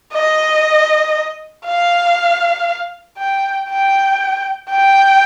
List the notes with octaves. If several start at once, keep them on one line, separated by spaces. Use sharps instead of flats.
D#5
F5
G5
G5
G5